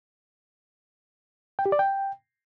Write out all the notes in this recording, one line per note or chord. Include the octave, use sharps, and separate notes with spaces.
G5
G4
D5
G5